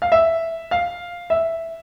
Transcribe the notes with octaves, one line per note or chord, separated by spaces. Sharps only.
F5
E5
F5
E5